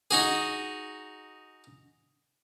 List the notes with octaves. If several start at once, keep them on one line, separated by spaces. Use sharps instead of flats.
D#4 F#4 G#4